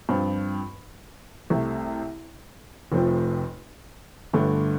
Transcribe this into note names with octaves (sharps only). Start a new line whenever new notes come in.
G2 F3 C4 F4
C2 C3 A3
F1 F2 F3 A3 C4
G1 G2 D3 A3